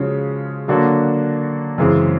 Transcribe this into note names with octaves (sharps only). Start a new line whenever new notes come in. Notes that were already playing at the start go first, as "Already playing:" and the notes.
Already playing: C#3 F3 G#3 C#4 F#4
D3 F#3 A#3 D4 F#4
F#2 C#3 E3 G#3 C4